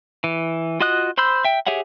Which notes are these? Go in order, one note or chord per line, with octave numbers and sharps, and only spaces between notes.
E3
F4 F#4 D#5 D#6 F#6
C5 B5 C6 E6 G6
E5 G5
G4 G#4 C#5 E5 F#5